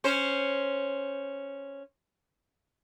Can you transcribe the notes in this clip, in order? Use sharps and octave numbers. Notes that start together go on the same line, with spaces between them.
C#4 C5